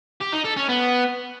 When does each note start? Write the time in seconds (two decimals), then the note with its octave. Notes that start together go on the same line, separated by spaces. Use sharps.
0.21 G4
0.33 D#4
0.45 A4
0.57 C#4
0.69 B3